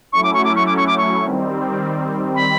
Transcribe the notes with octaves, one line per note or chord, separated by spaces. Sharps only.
F#3 A3 C#4 E4 C#6
D6
C#6
D6
C#6
D6
C#6
D6
C#6
D#3 G3 C4
B5